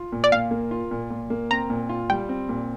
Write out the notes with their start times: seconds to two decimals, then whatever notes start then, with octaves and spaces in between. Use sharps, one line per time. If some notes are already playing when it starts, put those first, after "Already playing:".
Already playing: F4
0.12 A#2
0.24 D5
0.32 A#2 F5
0.51 A#3
0.71 F4
0.91 A#2
1.10 A#2
1.30 A#3
1.51 C4 A#5
1.70 A#2
1.89 F4
2.10 G3 G5
2.29 C4
2.49 A#2